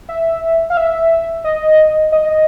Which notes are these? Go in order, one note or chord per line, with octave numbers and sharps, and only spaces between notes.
E5
F5
E5
D#5
D#5